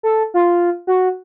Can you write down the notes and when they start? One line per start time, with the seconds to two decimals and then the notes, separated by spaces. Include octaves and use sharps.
0.03 A4
0.34 F4
0.87 F#4